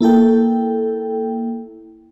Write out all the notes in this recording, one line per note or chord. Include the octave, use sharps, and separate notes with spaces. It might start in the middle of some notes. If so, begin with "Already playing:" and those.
A#3 E4 A4 G5